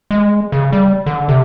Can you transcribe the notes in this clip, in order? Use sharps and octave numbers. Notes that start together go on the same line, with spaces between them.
G#3
C#3
G3
D3
C3